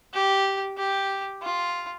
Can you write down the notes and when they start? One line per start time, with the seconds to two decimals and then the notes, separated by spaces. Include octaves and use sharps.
0.14 G4
0.78 G4
1.42 F4